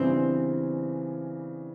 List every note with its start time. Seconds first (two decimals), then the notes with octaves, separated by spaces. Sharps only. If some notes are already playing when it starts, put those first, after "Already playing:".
Already playing: C#3 E3 G3 B3 C4 D4